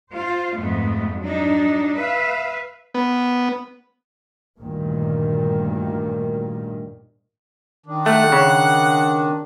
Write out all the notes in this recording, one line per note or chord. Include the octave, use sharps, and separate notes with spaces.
F4 C5
F2 G#2 A3 B3
F#3 D4 D#4
B4 E5 F5
B3
D2 G2 A#2 D#3
D#3 D4
A3 F#5
C#3